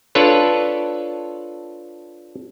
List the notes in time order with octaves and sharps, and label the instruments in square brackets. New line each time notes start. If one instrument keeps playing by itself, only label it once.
[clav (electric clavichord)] D4 F4 A4 B4 C#5